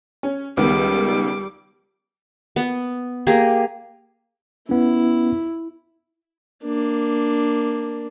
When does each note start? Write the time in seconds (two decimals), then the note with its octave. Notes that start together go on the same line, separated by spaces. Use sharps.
0.23 C#4
0.57 C#2 D#3 G3 B3 D6
2.56 B3
3.27 A#3 G4 G#4 A#4
4.69 B3 C#4 E4
6.64 A#3 D4